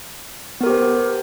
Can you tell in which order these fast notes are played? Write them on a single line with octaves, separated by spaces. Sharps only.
B3 A#4 G4 C5